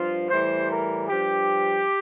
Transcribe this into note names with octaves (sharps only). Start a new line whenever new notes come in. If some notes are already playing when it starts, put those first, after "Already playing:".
Already playing: G2 F3 F4
A2 E3 G3 C5
A#4
G2 F3 G4